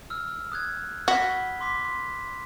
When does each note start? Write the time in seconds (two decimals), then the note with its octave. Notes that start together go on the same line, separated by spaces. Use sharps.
0.10 E6 F6
0.52 D#6 F#6 G#6
1.08 F#4 B5 B6 G7
1.61 C6 D6 B6
1.85 C6